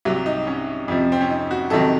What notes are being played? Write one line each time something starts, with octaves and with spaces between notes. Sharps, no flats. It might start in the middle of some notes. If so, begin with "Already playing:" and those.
C2 C3 F#3
D#4
C#4
F2 C3 F3
C4
C#4
D#4
F#4
F2 C3 D#3 F#3 A4